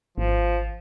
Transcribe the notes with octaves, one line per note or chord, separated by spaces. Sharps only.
G#1 F3